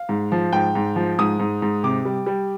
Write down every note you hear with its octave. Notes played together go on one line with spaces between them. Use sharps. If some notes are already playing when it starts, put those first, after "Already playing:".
Already playing: F5
G#2
F3
G#2 G5
G#2
F3
G#2 D#6
G#2
G#2
C3 D6
G3
G3